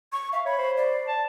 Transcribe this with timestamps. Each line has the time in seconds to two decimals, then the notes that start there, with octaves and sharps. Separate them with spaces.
0.12 C#6
0.33 E5 F5
0.46 C#5 B5
0.58 C5
0.77 D5
1.08 A5